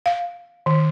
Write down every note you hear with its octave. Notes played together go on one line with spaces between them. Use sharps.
F5
D#3